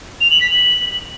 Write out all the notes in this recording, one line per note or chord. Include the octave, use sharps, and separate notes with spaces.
F7
F#7
B6
F#7